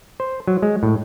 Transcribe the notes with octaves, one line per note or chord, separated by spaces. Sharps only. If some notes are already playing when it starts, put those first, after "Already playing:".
C5
F#3
G#3
A2